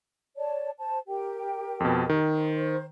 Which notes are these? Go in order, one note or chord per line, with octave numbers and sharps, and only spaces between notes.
C#5 D5 A5
C5 A5
G4 A#4 G5
F2 B2
D#3
C5